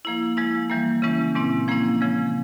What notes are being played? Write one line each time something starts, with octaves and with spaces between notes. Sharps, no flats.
F3 A#3 E4
F3 G#3 E4
E3 G3 A#3
C#3 E3 G#3 C#4 E4
A#2 G#3 C4 E4
F3 A#3 C#4 E4
C#3 F3 G#3